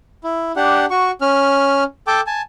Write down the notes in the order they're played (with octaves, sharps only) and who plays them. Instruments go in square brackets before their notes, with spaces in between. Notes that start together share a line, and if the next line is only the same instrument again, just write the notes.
[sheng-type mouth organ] E4
D4 G4 F#5
F#4 C#6
C#4 F6
A4 G5 A5 D6
G#5 A5